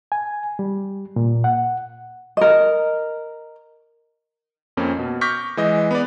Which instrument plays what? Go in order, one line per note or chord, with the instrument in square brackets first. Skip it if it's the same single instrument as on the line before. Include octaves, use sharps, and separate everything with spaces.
[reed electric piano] G#5
G3
A#2
F#5
[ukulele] A#4 D#5
[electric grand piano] F2 A#3 C4 C#4
B2
C#6 D6 F6 G6 A#6 B6
E3 G#3 D#5
B3 B4 D5